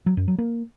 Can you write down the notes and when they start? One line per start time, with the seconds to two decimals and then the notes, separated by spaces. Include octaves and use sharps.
0.06 F#3
0.17 F#2
0.28 F#3
0.38 A#3